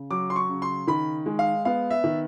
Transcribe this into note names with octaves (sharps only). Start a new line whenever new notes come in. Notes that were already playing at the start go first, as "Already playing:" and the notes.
Already playing: C#3
F#3 D6
C6
C#6
C#3
C6
D#3 B5
G#3
F5
B3 F5
E5
D#3